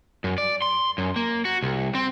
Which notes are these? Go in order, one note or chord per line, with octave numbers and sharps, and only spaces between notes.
F#2
D5
C6
F#2
A#3
F#4
C2
C4